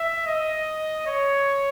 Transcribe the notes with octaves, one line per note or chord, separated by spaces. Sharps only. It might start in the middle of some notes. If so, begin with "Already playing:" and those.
Already playing: E5
D#5
C#5